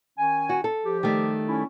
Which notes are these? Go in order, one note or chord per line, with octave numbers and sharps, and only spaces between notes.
D#3 C#4 G#5
F#4
A4
F3 G4
D#3 G3 A3
C#4 E4